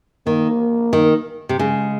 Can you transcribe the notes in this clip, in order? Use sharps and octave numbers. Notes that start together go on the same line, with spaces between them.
D#3 A#3
D#3
C3
C#3 G#3